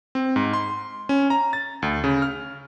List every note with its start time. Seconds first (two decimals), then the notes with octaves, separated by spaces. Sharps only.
0.15 C4
0.36 G#2
0.53 C6
1.09 C#4
1.30 A#5
1.53 A6
1.82 D2
2.04 C#3
2.22 F6